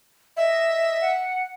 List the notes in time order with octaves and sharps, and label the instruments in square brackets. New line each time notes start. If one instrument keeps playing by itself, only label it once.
[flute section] D#5 [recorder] E5
[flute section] F#5